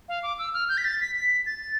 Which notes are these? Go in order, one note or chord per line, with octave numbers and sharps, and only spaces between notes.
F5
D6
E6
F6
G6
B6
A6
B6
B6
A6